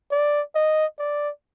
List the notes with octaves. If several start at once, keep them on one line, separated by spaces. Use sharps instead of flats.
D5
D#5
D5